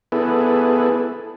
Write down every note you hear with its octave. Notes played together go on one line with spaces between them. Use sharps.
B3 E4 G#4 A4 B4